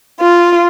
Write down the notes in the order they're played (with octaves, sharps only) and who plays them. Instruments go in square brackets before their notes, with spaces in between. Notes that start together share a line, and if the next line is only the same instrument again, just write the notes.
[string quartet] F4